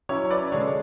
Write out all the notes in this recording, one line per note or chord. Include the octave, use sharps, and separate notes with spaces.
F#3 C#4 E4 C#5
B4 D5
D3 G#3 D4 C#5